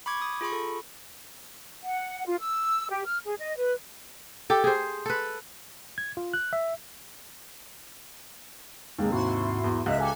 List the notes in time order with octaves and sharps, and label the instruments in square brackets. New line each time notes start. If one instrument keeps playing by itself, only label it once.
[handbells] B5 C#6 D6 G#6
D#6
F4 G#4 B5 C#6
A4
[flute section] F#5
F4
E6
G4
F6
G#4
D#5
B4
[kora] G4 A4
G#4 C5
A4 B4
[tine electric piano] G#6
F4
F#6
E5
[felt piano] D#2 C3 [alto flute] G#3
[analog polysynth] G#2 F#4 C6 [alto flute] E4
[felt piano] E2
[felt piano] C#2 [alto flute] D#5 [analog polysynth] E5 F#6
[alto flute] G4 [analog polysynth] A4 G#5